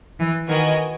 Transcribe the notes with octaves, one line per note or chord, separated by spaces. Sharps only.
E3
D#3 B3 F#4 A#4 D#5 G#5